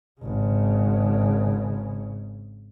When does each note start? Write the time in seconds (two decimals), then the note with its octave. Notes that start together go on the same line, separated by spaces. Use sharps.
0.21 G#1 C#3